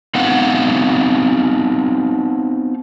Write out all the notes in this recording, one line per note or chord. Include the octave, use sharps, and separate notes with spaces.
B3 C4 D#4 F5 F#5